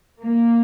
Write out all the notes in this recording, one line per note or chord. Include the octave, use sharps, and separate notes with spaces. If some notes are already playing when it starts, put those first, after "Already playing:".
A#3